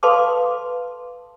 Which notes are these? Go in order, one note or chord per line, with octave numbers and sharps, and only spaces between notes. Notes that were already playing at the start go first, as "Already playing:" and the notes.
A4 B4 F5 A5 C6 D6